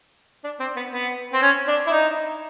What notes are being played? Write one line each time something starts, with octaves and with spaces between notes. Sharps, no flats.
D4
C4
B3
B3
C4
C#4
D4
E4
D#4